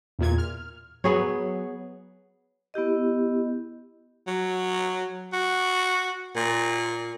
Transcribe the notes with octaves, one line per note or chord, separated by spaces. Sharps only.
E2 A#2 G#6
F6
F#3 B3 G#4 C#5
B3 E4 G4 D#5
F#3
F#4
A#2